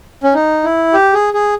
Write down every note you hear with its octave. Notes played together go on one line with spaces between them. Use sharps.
C#4
D#4
E4
G4
G#4
G#4